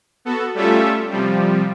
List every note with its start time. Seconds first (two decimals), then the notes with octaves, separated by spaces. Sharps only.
0.25 B3 F#4 A4
0.54 G3 A3 C#4 F4 A4 E5
1.10 C3 F3 G3